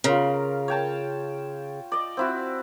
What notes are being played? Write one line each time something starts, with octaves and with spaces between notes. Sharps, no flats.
C#3 F4 A#4
C#5 G5 A5
D5 D#5
C4 E4 F#4